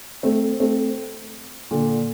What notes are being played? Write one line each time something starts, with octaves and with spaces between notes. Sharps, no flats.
A3 C4
A3 C4
A#2 D3